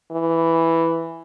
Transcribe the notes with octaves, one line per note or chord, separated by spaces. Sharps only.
E3